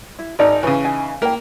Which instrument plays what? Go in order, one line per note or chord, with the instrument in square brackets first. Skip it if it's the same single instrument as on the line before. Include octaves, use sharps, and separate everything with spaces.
[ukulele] E4
[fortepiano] G#1 D#4 [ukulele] G#4 D5 D#5
[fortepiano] C#3 E3 [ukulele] C#5
[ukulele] D#4 G#5
[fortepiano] A#3 A#4 [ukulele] E4 G5